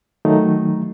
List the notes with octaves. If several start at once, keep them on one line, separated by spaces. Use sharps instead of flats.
D#3 F#3 A3 D#4